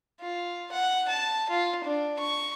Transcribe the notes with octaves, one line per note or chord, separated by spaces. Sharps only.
F4
F#5
A5
F4
D4
C#6